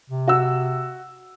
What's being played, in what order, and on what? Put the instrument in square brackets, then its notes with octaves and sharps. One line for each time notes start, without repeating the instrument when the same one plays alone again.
[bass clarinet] C3
[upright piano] F#4 E6